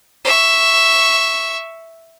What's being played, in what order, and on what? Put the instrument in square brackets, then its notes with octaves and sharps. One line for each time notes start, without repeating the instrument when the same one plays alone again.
[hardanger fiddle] E5 C#6